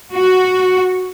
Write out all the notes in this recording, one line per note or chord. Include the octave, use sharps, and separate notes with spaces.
F#4